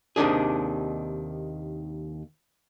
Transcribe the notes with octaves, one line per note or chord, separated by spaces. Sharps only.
D#2 C3 D#3 D4 G#4